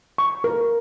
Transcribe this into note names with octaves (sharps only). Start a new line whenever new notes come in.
C#6
A#4